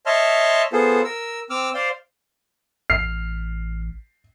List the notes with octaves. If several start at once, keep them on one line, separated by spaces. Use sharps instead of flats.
C#5 D#5 E5 A5 C6 F6
B3 F4 G#4 A4 C5
A#4 E6
C4 D6 E6 F6
C5 D5 F5 C6
A1 F6 C7